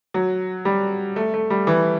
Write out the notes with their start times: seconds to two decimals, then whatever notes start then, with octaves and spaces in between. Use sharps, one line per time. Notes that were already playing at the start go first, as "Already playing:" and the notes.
0.14 F#3
0.65 G3
1.16 A3
1.34 A3
1.50 G3
1.67 E3